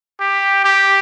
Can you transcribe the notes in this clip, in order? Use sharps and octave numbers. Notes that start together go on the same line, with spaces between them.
G4
G4